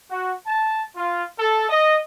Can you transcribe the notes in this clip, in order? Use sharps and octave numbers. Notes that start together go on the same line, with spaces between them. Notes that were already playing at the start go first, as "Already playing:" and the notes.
F#4
A5
F4
A4
D#5